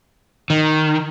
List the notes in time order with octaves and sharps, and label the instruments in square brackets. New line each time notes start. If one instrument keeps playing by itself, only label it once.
[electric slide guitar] D#3